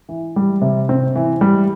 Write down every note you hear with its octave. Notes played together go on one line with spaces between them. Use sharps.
E3
G3
C3
C4
E3
G3